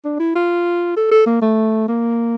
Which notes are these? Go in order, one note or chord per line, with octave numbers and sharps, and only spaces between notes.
D4
E4
F4
A4
A4
A#3
A3
A#3